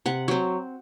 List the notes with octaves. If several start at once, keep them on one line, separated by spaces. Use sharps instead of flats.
C3 F#5
F#3 C4